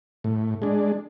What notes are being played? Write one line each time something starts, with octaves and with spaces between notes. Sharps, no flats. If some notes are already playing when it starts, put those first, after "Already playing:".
A2
G#3 D4